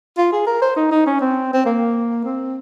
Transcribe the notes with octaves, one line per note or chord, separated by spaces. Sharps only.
F4
G#4
A#4
C5
D#4
D#4
C#4
C4
C4
A#3
C4